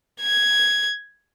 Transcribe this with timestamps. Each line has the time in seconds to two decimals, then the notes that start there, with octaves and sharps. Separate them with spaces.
0.21 G#6